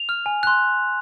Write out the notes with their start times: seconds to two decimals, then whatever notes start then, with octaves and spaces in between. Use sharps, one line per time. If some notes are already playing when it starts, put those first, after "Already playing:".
Already playing: F7
0.09 F6
0.26 G#5
0.43 C6 F#6